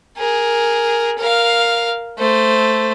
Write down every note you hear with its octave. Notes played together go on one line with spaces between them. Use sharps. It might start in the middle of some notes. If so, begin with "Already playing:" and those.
G#4 A#4
A#4 F5
A3 C5